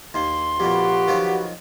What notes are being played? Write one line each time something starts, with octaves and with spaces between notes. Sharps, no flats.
D#2 C6
F2 A#2 F#4 G4 B4
D#3 F3 F#3